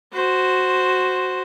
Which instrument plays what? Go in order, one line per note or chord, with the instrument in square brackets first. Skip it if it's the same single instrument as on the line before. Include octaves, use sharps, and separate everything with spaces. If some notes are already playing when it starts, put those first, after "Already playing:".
[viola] F#4 C5